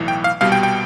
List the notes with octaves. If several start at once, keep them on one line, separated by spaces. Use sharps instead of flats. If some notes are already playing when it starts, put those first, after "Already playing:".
Already playing: B1 A2 E3
G5
F5
C2 B2 G3 F5
G5
G5